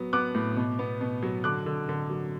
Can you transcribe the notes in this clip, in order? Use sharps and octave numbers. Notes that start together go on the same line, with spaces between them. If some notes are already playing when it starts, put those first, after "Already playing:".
Already playing: F#3 B3
B3 D6 F#6
A2
B2
B3
B2
F#3
D3 D6 F#6
D3
D3
F#3